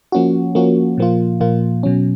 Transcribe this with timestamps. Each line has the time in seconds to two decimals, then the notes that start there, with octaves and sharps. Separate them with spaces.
0.12 F3 A#3 C#4 F#4
0.55 F3 A#3 C#4 F#4
0.98 A#2 F3 A#3 F4
1.41 A#2 F3 A#3 F4
1.83 B2 F#3 C#4